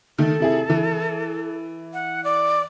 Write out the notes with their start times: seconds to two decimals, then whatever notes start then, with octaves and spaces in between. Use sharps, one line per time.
0.18 D#3 A3 A4
0.40 C3 E4 G#4
0.70 E3
1.94 F#5
2.24 D5